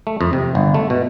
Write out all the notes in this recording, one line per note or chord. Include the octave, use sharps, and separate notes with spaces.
A3
F2
C3
G1
A3
B2